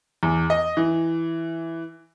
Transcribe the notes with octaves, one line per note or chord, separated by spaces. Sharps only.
E2
D#5
E3